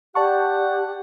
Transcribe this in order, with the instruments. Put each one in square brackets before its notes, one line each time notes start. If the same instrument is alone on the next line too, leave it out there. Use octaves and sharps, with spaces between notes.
[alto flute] G4 [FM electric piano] D5 A5 C#6 [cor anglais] F#5